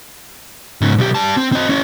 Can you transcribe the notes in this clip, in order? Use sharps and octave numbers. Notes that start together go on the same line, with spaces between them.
G#2 C#3
B1 G4
G3 A5
C4
C4 D#5
C#4 E4